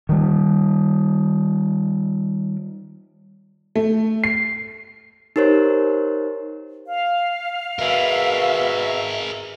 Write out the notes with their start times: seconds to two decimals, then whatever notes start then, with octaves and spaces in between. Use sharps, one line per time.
0.09 D#3 G3
3.76 A3
4.24 C7
5.36 D#4 G4 A#4 C5 C#5
6.87 F5
7.79 B2 G#4 A#4 E5